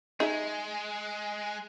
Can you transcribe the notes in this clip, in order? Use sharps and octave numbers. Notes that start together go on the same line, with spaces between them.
G#3 D#4 G#4 E5